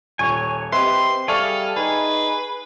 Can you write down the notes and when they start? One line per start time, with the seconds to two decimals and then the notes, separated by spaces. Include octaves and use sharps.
0.19 D#1 C#5 G#5 C#6
0.73 C4 G4 B4 D#5 E5 C6
1.28 G3 G#4 A4 D5 E5 F5 C#6
1.77 D#4 G#4 B4